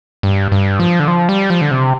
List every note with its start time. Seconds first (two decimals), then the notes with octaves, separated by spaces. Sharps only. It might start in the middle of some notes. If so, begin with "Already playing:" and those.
0.23 G2
0.52 G2
0.80 F3
1.00 D3
1.08 F3
1.29 G3
1.50 F3
1.61 D3
1.71 C3